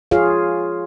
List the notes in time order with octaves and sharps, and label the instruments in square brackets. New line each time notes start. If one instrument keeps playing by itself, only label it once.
[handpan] F4 G#4 C#5 F5